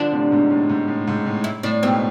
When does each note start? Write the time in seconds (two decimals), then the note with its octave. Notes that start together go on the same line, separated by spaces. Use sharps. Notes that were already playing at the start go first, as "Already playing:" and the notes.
Already playing: D3 F3 D4
0.12 A2 C3
0.31 G#2 B2
0.50 A2
0.69 G#2
0.88 A2
1.07 G#2
1.26 A2
1.44 E4
1.63 A2 D4
1.82 G#2 B2 C4